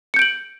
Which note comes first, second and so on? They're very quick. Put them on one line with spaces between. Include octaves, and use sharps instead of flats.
C#7 G6 D7 F#7